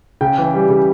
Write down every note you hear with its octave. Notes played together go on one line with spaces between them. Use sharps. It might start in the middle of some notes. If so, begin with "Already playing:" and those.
C#3 G5
E3
G3
C#3